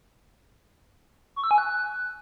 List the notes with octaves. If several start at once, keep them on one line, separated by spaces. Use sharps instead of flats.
C#6
E6
G#5
F#6